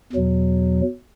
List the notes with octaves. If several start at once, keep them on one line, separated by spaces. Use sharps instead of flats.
E2 B2 F#3